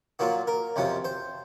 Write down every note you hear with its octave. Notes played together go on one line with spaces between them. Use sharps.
A#2 F#3 A#3 F4 F#4
A#4
F2 C3 F#3 C#4 F4
C5